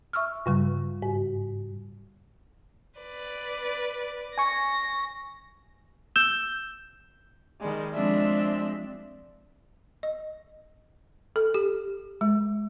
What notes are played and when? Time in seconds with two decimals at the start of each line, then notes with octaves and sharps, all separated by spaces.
0.13 E5 C#6 E6 F6
0.46 G2 C#3 G3
1.02 G#2
3.00 B4 D5
4.38 G#5 C#6 A#6
6.16 E6 G6 E7 G7
7.60 D#3 G3 G#3
7.94 F3 G#3 C4 D4 E5
10.03 D#5
11.36 A4
11.54 G4
12.21 G#3